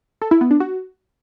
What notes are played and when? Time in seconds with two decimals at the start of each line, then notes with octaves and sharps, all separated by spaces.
0.22 A4
0.31 E4
0.41 B3
0.51 D4
0.60 F#4